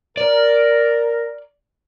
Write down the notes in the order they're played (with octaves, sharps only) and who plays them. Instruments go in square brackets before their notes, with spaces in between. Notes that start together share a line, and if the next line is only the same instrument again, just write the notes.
[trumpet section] A#4 [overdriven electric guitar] D5